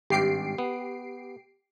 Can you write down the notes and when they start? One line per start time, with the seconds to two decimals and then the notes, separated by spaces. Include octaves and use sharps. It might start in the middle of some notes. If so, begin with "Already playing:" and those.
0.10 G#1 G2 G4 C7 D7
0.58 B3